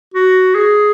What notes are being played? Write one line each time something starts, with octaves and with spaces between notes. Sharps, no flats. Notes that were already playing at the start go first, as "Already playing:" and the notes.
F#4
G#4